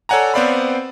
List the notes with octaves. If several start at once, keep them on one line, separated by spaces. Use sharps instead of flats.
A4 C#5 D5 F#5 G#5 A#5
B3 C4 C5 D5 F5 B5